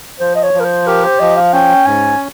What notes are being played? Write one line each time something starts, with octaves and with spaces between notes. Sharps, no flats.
F3 C5
D#5
C#5
F3
A#4
C5
G4 A#4
C5
F3 D#5
F5
C#4 G5
G#2 G#5